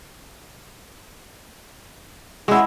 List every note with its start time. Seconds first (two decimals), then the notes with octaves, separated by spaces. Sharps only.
2.48 G#3 C#4 E4 F#4